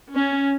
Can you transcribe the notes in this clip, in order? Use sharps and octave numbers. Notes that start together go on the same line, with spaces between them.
C#4